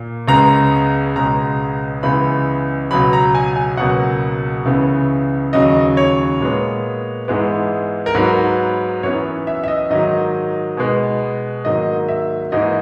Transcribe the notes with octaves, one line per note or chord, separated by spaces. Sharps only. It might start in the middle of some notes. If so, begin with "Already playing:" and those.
Already playing: A#2 A#3
C#2 C#3 G#3 B3 A#5
C#2 B2 G#3 B3 A#5
C#2 C#3 E3 G#3 B3 B5
C#2 B2 F#3 B5
A#5
G#5
G#5
C#2 B2 F#3 A#3 F#5
C#2 C#3 E3 B3
D#2 C#3 F#3 D#5
C#5
A#2 G#3 B3
G#2 E3 G#3 B3
A#4
G#2 F#3 B3 B4
F#2 E3 B3 C#5
E5
E5
D#5
G#2 D#3 F#3 D#5
B2 G#3 B3
G#2 D#3 F#3 A#3 D#5
E5
G#2 E3 A#3 D#5